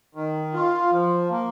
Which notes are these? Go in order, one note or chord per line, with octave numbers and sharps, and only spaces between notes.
D#3
F4
F3
A#3